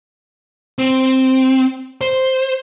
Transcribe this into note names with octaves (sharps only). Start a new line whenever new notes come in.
C4
C5